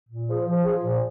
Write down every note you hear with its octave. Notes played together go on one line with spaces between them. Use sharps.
A#2
F3 G#4
F3
F3 G#4
A#2